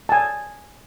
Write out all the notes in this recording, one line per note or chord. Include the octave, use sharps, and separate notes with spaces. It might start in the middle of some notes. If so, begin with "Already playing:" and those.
G#5 A5